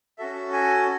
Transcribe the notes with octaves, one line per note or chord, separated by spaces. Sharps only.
C#4 F#4 A4 E5
G#5